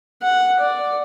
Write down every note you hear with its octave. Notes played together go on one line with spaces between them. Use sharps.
F#5
D5